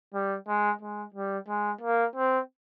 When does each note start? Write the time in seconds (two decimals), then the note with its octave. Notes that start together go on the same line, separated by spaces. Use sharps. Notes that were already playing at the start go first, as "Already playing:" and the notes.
0.14 G3
0.48 G#3
0.81 G#3
1.14 G3
1.48 G#3
1.81 A#3
2.16 C4